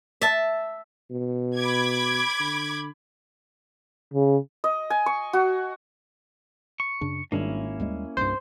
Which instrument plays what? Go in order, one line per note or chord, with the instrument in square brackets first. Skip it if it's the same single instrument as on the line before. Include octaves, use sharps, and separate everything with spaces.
[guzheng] E5 A5
[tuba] B2
[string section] B5 D6 G#6
[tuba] D3
[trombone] C#3
[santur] D#5
G#5
C#6
F#4
[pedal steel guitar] C#6
[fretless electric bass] F#2 C#3 D4
[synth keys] G#1 [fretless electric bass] G#2 G3 D4 [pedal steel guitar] A#3 C#4 E4
[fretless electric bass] D#2 G3 G#3
[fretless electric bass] C2 G2 [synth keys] C5